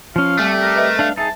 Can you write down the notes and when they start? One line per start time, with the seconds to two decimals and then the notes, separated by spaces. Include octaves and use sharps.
0.16 F3 C#4 F5
0.39 G3 A3 C4 G4 D5
0.62 A#4
0.76 B4 D#5 E5
0.99 D4 F5
1.17 D#4 G#4 E5 A5